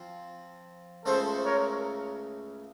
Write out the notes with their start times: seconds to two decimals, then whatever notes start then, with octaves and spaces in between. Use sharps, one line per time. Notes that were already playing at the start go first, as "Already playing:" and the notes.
Already playing: F3 C4
1.05 C#2 C#3 A3 C#4 A4 C5
1.45 A#4 C#5